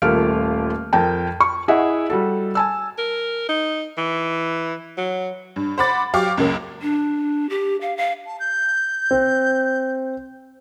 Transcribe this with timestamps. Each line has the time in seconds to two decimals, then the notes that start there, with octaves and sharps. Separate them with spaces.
0.02 D#1 A3 A#3 F4 F6 D7
0.93 F2 A#4 G5 A5
1.41 C#6
1.68 E4 G#4 D#5 E5 F#5
2.10 G3 F#4 A4
2.55 G#5 A5 E6
2.98 A#4
3.49 D#4
3.97 E3
4.97 F#3
5.56 G2
5.78 C5 F#5 B5 D6 A6
6.13 F#3 G4 F5 C#6 D6
6.38 C#2 F#2 A#3
6.82 D4
7.50 G4
7.81 F5
7.97 F5
8.25 A5
8.40 G6
9.11 C4